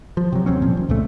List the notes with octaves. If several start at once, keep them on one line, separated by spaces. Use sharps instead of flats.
F3
C3 F#3
D#2 F#3 C4 C#4
A#2 F3
D#1
F1 C#2 A#2 A3